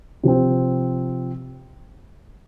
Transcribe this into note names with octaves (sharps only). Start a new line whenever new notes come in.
C3 F3 C4